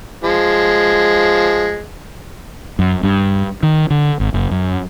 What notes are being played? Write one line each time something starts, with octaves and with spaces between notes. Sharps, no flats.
F3 G#3
F#2
G2
D#3
D3
G#1
F#1
F#2